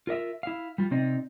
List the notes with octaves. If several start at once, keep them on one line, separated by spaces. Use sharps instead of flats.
F4 A#4 D#5 E5
E4 F5
G3 F4
C3 C4 D#4 D5